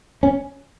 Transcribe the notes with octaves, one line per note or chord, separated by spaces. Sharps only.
C#4